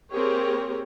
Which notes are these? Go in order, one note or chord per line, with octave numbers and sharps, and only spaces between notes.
A#3 C4 G4 G#4 A#4 C#5